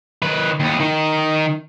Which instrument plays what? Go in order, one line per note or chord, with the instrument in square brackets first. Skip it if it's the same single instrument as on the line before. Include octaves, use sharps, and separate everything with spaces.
[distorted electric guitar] D#3 B4
D#2 B3
D#3 D#4